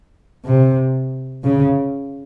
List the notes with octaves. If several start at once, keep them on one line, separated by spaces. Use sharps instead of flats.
C3
C#3